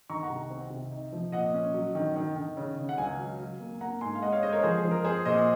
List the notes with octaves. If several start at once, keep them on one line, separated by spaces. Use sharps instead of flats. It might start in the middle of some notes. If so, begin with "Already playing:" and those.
D#3 A#5 C#6
F#5 A#5
C2
C4
C3
D#4
F3
A#2 D#5 F#5
C#4
F#3
D#3
D#3
D#3
C#3
C#3
F#5
C#2 F5 G#5
F#3
F#3
A#3
A#3 F#5 A#5
G#2 G#5 C6
F5
G#3 D#5 F#5
C#5 F5
G#3 C5 D#5
A#4 C#5
F3 G#4 C5
G#4
F3
A#4
C4 G#4 C5
A#2 C5 D#5